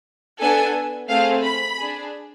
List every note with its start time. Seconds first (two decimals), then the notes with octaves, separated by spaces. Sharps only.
0.39 B3 D4 A4 G#5
1.09 A3 C4 G#4 F5
1.44 B5
1.78 D4 G#4